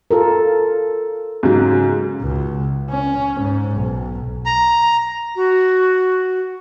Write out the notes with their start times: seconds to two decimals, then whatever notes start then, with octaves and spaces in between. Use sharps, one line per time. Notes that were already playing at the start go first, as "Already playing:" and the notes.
0.11 F4 A4 A#4
1.43 G#2 C#3 F#3
2.22 C#2
2.90 C#4
3.40 G#2
3.76 B1
4.46 A#5
5.36 F#4